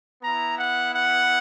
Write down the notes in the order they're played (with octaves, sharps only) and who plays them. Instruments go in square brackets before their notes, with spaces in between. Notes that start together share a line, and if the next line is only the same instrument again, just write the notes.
[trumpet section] B3 E4 A#5
F#5
F#5